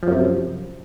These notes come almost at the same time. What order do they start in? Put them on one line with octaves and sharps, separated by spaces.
F3 F#2 C3